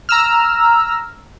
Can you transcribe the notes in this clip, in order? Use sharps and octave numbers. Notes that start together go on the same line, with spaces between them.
A#5 E6 F6